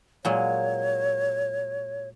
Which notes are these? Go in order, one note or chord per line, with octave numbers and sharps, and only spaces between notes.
A#2 F#3 G#3 C#5